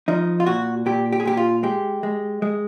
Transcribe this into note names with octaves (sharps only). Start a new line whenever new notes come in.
F3 D#4
F4
A#2 F#4
A#2 G4
G4
G#4
A#2 G4
F4
G#3 G4
G#3
G#3